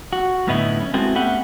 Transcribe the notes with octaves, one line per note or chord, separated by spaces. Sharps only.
F#4
F#2 A2 D3 B3 D#4 E4
C#4
G#3 B3 C4 E4 F#4 A4
A3 B3 C#4 G4 E5 F#5